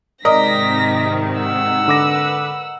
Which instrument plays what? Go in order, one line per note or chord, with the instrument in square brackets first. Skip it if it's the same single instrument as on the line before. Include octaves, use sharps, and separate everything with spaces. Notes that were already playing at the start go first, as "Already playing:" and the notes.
[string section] G#2 C3 D#3 [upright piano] A#4 D#5 [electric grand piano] D5 [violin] A#6 B6
[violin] F#5 E6
[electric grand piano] D3 D6 A#6 [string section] B4